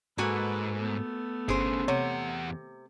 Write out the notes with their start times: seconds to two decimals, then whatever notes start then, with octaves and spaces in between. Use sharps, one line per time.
0.18 G#2 A#3 F#4 A4 B4 G#5
0.75 A3 B3
1.48 G1 D3 C#4 G#4 C5 D7
1.88 E2 C3 C#5 F#5